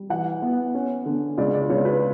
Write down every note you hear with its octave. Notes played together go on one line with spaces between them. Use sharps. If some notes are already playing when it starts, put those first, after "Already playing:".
Already playing: G3
E3 F#5
B3
C#4
D3
C#2 D5
D5
C#2 C#5
B4